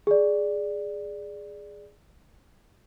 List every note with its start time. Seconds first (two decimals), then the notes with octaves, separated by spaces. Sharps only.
0.07 G#4 D5